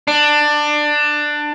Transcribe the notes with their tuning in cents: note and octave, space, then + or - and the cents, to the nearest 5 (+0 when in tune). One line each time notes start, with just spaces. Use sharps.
D4 +15